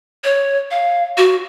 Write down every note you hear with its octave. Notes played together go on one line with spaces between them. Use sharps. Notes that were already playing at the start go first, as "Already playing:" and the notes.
C#5
F5
F#4